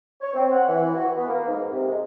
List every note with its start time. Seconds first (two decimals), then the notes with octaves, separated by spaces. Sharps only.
0.22 C#5
0.34 C4
0.52 F#5
0.68 E3
0.96 F#4
1.16 B3
1.28 A#3
1.47 G#2
1.70 C3
1.87 G#3